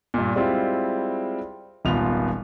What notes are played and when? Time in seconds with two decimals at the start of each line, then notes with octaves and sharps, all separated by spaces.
0.14 G2 A#2
0.36 G3 G#3 C4 E4 F4
1.85 D#1 G#1 B3 F4 F7